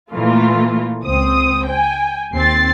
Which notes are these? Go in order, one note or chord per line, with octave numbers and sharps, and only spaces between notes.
A#2 E3 A3 A#3 F4
C#2 C4 D#6
G5 G#5
D#2 C4 A6 C7